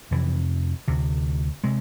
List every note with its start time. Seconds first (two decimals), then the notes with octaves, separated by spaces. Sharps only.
0.11 F2 C3 E3
0.88 D2 C3
1.64 C3 G#3